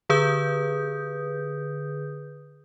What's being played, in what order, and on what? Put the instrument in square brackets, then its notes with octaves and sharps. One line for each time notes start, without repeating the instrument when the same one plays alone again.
[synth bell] D3 G#4 B4 D#6 G6